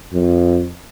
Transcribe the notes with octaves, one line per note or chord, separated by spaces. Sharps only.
F2